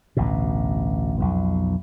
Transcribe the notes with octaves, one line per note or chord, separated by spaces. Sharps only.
A1 D2 B2
B1 F2 B2